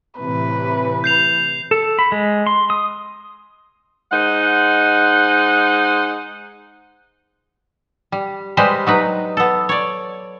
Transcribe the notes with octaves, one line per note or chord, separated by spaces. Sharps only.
A2 C3 E3 B4
G6 C7 F7
A4
B5
G#3
C6
D#6
G#3 D#4 C5 F#5
G3
G3 G#3 B4 C5 D#5
F#3 D#4 B4
B3 A4
C#5 D5